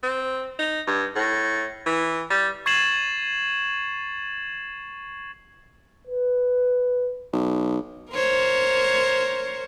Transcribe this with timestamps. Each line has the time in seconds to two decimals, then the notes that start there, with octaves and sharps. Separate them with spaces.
0.03 C4
0.59 D#4
0.87 G2
1.16 A2
1.86 E3
2.30 G3
2.66 C#6 G#6 A6 C7 E7 F#7
6.07 B4
7.33 B1
8.12 A#4 C5 C#5